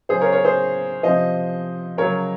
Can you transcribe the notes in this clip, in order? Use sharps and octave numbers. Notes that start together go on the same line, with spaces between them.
C#3 F#3 G#4 C5
A#4 C#5
A#4 C#5
G#4 C5
C3 F3 C5 D#5
C#3 F#3 A#4 C#5